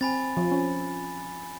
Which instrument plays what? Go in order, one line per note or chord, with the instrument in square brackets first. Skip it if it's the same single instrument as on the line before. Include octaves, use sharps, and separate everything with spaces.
[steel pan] C4 [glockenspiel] G#5 B5 A6
[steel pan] F3
C#4